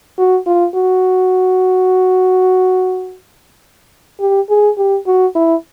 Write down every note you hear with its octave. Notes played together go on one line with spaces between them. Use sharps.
F#4
F4
F#4
G4
G#4
G4
F#4
E4